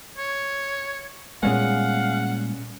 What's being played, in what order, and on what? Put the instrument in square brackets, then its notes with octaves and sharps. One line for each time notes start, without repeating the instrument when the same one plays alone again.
[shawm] C#5
[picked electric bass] A#2 G3 G#3 [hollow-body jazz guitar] B3 C#4 G#4 [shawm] F5 [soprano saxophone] F#5